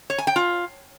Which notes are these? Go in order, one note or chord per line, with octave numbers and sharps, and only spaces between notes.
C#5
G#5
G5
F4